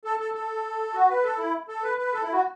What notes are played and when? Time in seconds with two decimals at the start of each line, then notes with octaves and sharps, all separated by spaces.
0.05 A4
0.20 A4
0.34 A4
0.94 F#4
1.09 B4
1.23 A4
1.38 E4
1.68 A4
1.83 B4
1.98 B4
2.13 A4
2.23 E4
2.33 F#4